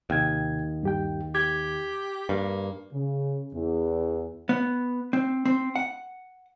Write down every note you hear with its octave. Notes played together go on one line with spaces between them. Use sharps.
D#2 C3 G5 G#6
G2 G4 G5
G4 G#6
G2 A#3
C#3
E2
B3
C4
C4
F#5